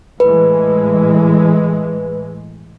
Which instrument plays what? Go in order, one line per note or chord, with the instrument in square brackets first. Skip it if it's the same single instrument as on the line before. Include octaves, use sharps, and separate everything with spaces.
[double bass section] A2 E3 G#3 [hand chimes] B4